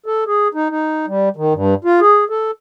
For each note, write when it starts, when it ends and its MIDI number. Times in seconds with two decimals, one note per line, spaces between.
0.06 0.24 69
0.27 0.48 68
0.54 0.70 63
0.70 1.06 63
1.07 1.29 55
1.36 1.53 51
1.54 1.74 43
1.84 2.00 65
2.00 2.24 68
2.29 2.51 69